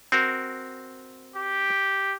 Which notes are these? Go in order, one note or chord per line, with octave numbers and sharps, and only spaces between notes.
C4 F#4 A#4
G4